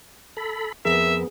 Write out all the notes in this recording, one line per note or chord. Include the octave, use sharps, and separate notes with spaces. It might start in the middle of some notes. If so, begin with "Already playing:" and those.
A4 B5
F2 B3 G#4 A#4 E5